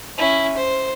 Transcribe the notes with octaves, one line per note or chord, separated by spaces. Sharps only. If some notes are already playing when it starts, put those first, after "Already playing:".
C#4 E4
C5